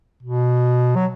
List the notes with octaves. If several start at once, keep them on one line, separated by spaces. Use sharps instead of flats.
B2
F#3